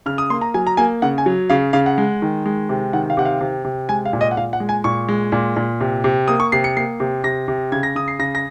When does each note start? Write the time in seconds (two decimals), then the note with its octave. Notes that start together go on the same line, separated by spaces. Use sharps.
0.06 C#3 F6
0.18 D#6
0.30 A#3 C6
0.41 A#5
0.54 F#3 G#5
0.67 A#5
0.77 A#3 G#5
1.02 C#3 F#5
1.18 G#5
1.26 F#3
1.50 C#3 F5
1.73 C#3 F5
1.86 F#5
1.98 G#3
2.22 D#3
2.46 G#3
2.69 C3
2.93 D#3 F#5
3.10 F5
3.17 C3 F#5
3.25 F5
3.41 C3
3.64 C3
3.89 G#3 G#5
4.05 F5
4.13 A#2
4.21 D#5
4.31 F#5
4.37 A#2 F5
4.53 F#5
4.60 G#3
4.69 G#5
4.84 A#2 C#6
5.08 G#3
5.32 A#2
5.56 A#2
5.80 C3
6.04 C3
6.28 A#3 D#6
6.40 C#6
6.52 C3 C7
6.64 C#7
6.77 A#3 C7
7.00 C3
7.24 C3 A#6
7.48 C3
7.72 C#3 G#6
7.83 A#6
7.95 C#3 D#6
8.08 C7
8.19 C#3 A#6
8.35 A#6